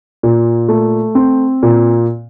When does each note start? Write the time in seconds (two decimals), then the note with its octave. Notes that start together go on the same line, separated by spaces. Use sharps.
0.23 A#2
0.69 A3
1.15 C4
1.63 A#2